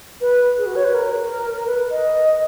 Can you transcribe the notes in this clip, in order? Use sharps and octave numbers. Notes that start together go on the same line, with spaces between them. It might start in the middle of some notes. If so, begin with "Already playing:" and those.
B4
G#4
F#4
C#5
B4
A#4
B4
D#5